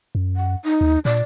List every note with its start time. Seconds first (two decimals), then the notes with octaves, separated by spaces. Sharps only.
0.15 F#2
0.36 F#5
0.65 D#4
0.81 D#2
1.05 A#2 D5